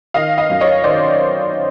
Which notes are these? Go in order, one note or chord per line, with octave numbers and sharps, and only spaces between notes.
D#3 D#5 F5
D#5 F5
F#2
C#5 D#5
D#3 C5 D5